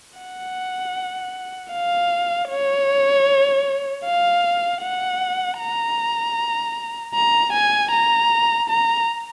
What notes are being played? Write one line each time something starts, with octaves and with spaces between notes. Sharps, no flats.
F#5
F5
C#5
F5
F#5
A#5
A#5
G#5
A#5
A#5